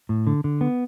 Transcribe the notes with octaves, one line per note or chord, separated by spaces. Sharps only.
A2
D3
D3
B3